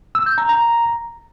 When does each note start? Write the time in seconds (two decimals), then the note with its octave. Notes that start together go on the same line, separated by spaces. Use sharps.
0.15 E6
0.26 G6
0.38 A#5
0.49 A#5